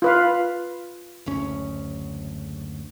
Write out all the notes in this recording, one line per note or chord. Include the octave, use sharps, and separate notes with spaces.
F4 B4 F5
F#1 D2 C#4